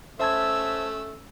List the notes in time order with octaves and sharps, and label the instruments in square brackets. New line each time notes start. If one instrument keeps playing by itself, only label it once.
[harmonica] A3 [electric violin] C#4 E6 [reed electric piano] C5 A5 G#6 [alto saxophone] E5